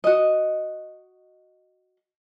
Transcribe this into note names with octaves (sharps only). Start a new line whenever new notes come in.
F#4 D#5